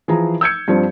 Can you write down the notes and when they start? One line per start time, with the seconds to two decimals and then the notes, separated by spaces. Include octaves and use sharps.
0.08 E3 F3 G#4 A#5
0.41 E6 G6 G#6 C#7
0.68 G2 F3 C4